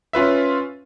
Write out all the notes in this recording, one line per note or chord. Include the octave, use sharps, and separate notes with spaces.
C#4 F4 B4 E5